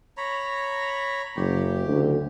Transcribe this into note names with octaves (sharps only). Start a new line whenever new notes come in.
C#5 A#5 B5
F#1 G4
D2